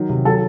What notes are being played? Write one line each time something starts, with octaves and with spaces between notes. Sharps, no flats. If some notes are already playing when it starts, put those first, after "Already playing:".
Already playing: D#3 F#3
C3
F#3 A4 A5